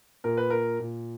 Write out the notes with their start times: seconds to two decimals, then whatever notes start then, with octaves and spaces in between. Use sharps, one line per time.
0.24 A#2 A#4
0.37 B4
0.50 A#4
0.80 A#2